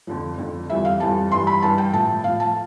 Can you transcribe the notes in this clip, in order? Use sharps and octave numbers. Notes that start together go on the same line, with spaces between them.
F2 D3 F3
F2 D3 F3
F2 E3 G3 E5
F5
F2 E3 G3 A5
G2 E3 G3 C6
B5
G2 E3 G3 A5
G5
A2 F3 A5
A2 F3 F5
A5